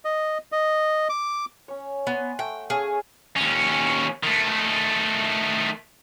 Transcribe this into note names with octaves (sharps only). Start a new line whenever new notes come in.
D#5
D#5
D6
C#4 C#5
B3 F#5 G#5 C6
A3 G5
C#4 G#4 A4 F5
D#2 C#4
D#3 A3